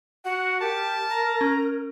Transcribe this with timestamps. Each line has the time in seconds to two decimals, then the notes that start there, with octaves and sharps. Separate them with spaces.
0.25 F#4 F#5
0.61 G4 A#4 A5
1.10 A#5
1.41 C#4